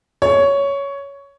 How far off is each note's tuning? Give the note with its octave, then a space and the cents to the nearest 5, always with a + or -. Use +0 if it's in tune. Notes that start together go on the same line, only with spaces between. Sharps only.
C#5 +10